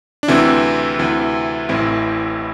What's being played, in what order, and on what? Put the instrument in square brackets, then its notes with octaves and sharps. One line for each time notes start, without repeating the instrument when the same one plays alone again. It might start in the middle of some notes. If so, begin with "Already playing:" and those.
[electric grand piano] D4
D2 C3 E3 C4 E4
D2 C3 E3
A1 A2 E3 C4 E4